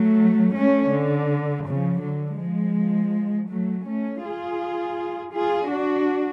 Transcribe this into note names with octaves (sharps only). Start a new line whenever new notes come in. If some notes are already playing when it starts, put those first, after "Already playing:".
Already playing: F#3 A3
A3 C#4
D3
C#3 F3
D3 F#3
F3 G#3
F#3 A3
A3 C#4
F4 G#4
F4 G#4
D4 F#4